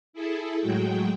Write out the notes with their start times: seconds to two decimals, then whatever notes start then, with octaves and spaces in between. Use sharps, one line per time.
0.13 E4 G#4 A4
0.60 A2 F#3 G#3 F#4 G5